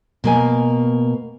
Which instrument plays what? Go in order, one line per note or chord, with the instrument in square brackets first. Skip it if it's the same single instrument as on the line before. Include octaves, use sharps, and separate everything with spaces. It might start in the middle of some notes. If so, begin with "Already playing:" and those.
[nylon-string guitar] B2 A#3 G#5